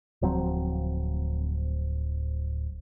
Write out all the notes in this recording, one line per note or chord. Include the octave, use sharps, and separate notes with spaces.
D1 F3 F#3 C4